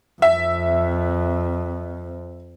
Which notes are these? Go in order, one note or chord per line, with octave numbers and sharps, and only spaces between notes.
F2 E5